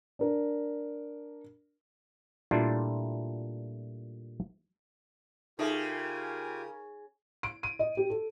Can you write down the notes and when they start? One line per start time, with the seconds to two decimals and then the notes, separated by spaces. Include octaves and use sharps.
0.19 D4 A#4
2.51 A#2 G3 A3 D4 E4 F4
5.59 C#3 D#4 F4 G4 A4 A#4 E5 G#5
7.43 D7
7.63 D#7
7.79 D#5
7.97 G4
8.10 A4